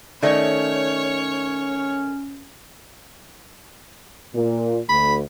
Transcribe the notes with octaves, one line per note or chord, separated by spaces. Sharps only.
D#3 A3 C#4 C#5 D5 E5
A#2
D2 A3 B5